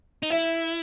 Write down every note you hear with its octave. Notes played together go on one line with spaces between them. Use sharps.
D#4
E4 E5